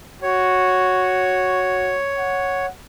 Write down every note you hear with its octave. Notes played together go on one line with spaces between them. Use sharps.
F#4 C#5
F#5